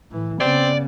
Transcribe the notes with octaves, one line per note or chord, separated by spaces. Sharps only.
A2 E3
C#3 B3 C4 D5